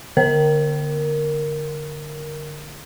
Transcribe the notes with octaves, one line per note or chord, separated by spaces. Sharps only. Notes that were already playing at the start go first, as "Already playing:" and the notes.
D3 A#4